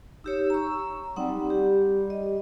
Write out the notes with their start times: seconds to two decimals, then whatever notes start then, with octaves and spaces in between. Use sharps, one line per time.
0.24 D#4 G4 C#5 E6
0.50 A#5 C#6
1.16 G3 C4 D#4 F#5
1.50 G4
2.10 D#5